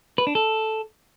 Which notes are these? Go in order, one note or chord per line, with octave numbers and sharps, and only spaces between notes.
B4
D4
A4